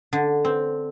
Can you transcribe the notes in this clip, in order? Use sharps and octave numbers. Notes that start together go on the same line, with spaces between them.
D3
C4